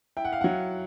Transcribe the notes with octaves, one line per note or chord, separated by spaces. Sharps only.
E4 G5
F#5
F5
F#3 F#5